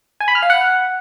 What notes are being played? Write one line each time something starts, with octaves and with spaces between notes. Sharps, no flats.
G#5
B5
F6
F5
F#5